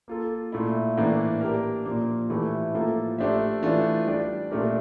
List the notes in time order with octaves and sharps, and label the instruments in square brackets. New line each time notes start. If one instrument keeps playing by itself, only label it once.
[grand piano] A#3 F4 A4
A#2 A3 E4
A2 E3 A#3 D4
A#3 D4 G4 A#4
A#2 F3 A#3
A2 E3 A3 E4 G4
A2 F3 A#3 F4 A4
A3 D4 G4 C5 E5
E3 A3 D4 F4
G3 D4 G4 D5
A#2 A3 D4 G4 A#4